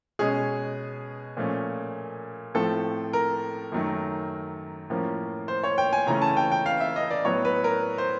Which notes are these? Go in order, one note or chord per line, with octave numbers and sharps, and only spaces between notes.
B2 G#3 C#4 G#4
A#2 F3 A3 C#4
A2 F3 A3 C4 A4
A#4
F#2 D#3 F#3 A3
A2 F3 A#3 C#4
C5
C#5
G5
G#5
C#3 E3 A3 C#4 A#5
A5
G5
G5
F5
E5
D#5
D5
A2 F#3 B3 C#5
B4
A#4
C5